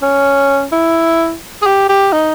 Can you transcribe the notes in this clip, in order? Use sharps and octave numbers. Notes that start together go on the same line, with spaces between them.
C#4
E4
G#4
G4
G4
D#4